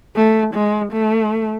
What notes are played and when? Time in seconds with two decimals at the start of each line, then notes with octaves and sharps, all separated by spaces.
0.16 A3
0.55 G#3
0.93 A3